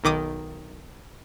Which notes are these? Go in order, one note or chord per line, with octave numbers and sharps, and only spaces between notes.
B1 D#3 D6 D#6